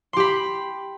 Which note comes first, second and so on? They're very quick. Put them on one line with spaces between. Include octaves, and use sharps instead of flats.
C6 G4 B5